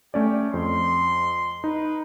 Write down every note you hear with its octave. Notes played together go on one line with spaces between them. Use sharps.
A3 C#4 G4 D5
F2 C6
D#4 B4